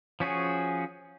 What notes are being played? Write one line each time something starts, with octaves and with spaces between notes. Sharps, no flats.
F3 C#4 F#4 G#4